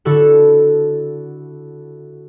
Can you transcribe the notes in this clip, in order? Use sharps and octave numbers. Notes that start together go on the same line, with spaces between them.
D3 E4 F#4 A4